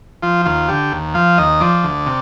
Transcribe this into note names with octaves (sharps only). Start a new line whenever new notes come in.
F3 F4
D#2 F4
D3 G4
D#2
F3 F5
D#2 D#5
F3 D5
D2
C3